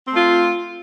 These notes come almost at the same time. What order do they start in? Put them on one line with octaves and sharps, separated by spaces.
C4 A3 F4